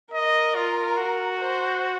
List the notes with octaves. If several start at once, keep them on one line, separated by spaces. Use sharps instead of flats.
A#4 D#5
F4
F#4
C5